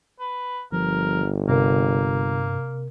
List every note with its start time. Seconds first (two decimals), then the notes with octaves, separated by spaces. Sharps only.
0.19 B4
0.72 G1 F3 A#4
1.49 G2 C3 A#3 A#4